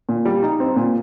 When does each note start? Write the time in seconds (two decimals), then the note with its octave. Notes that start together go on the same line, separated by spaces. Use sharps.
0.09 A#2
0.25 G3
0.43 D#4
0.60 C4
0.76 A#2